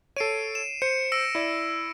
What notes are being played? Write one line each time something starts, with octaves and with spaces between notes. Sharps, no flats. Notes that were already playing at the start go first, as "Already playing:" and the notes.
A4 C#5 C7 D7 D#7
E7
C5 C#7
E6 A#6 D7
E4 D5